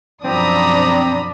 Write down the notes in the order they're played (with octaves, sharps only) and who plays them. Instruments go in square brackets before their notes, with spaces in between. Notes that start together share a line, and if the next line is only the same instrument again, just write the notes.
[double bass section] F#2 B2 F3 [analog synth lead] C4 [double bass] D4 [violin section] A#5 B5 D#6